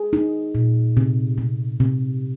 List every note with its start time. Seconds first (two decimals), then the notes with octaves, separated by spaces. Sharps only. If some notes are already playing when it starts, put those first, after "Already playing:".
Already playing: G#4
0.13 D#4
0.55 A#2
0.97 C3
1.38 C3
1.80 C3